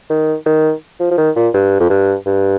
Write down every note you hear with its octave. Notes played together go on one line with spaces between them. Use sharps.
D#3
D#3
F3
F3
D#3
A#2
G2
F2
G2
G2